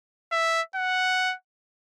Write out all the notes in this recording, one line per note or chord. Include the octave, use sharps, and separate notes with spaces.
E5
F#5